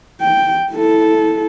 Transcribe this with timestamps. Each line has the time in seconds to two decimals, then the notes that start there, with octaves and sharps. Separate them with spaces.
0.21 G5
0.73 E4 A4